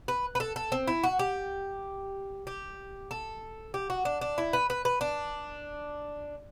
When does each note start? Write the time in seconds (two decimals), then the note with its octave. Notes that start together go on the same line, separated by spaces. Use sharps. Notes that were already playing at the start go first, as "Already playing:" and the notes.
0.08 B4
0.35 B4
0.40 A4
0.56 A4
0.72 C4
0.87 E4
1.03 F#4
1.19 G4
2.47 G4
3.11 A4
3.74 G4
3.90 F#4
4.05 D4
4.21 D4
4.38 E4
4.53 B4
4.70 B4
4.85 B4
5.01 D4